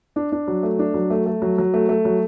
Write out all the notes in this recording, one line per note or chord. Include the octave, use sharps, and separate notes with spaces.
D4
D4
F#3
A3
D4
F#3
A3
A3
F#3
F#3
A3
A3
F#3